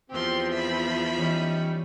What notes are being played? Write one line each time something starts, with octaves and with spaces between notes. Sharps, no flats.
E2 F3 C4 G4 C6
E5 B5
E3 G3 C#4 D#4